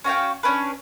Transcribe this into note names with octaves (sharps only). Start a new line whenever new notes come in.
C#4 F#4 F5 G5
C#4 D4 B4